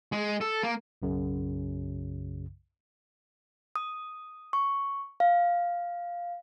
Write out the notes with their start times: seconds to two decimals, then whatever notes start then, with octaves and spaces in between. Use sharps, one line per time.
0.12 G#3
0.41 A4
0.63 A#3
1.02 B1 F#2 C#3
3.76 D#6
4.53 C#6
5.20 F5